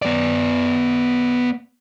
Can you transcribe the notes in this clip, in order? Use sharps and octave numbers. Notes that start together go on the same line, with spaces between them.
B3 D5